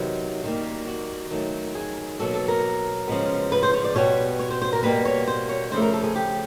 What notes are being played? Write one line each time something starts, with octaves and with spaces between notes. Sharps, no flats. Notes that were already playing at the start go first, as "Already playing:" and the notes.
Already playing: C3 D#3 F#3 B3
D#3 G3 A#3
F#4
D#3 F#3 A3
G#4
B2 F#3 A#3 A4
A4
A#4
C#3 F3 G#3 B3
B4
C5
C#5
D5
B2 G3 B3 C#5
C#5
C5
C5
A#4
B2 G3 A#3 B4
C#5
C5
C#5
C#3 F3 A3 C5
A#4
A4
G#4
G4